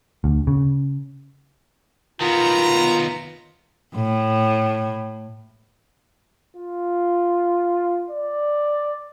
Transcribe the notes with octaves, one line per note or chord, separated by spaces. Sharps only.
D2
C#3
D#3 B3 F4 A#5
A2
F4
D5